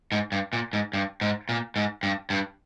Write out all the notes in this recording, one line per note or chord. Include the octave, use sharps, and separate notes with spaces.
G#2
G2
A#2
G#2
G2
G#2
A#2
G#2
G2
G2